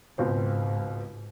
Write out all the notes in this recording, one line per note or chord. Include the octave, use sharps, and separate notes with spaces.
C#2 G#2 B2 C4